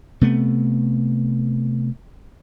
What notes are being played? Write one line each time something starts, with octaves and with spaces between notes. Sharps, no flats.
C3 A3 B3